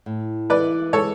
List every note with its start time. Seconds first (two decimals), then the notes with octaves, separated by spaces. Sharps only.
0.06 A2
0.50 E3 B4 D5
0.93 G#3 A4 C#5